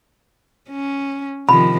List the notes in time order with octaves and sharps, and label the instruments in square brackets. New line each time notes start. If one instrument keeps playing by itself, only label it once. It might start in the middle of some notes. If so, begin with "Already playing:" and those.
[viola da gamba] C#4
[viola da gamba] C3 D#3 F3 [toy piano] B5